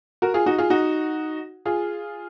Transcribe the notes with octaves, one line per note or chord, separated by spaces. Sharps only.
F#4 A#4
F4 G#4
D#4 F#4
F4 G#4
D#4 F#4
F4 G#4